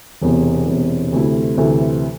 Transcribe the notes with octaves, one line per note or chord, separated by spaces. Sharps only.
E1 E2 C3
E1 E2 C3
D2 C3 E3 A3 E4
D2 C3 E3 A3 E4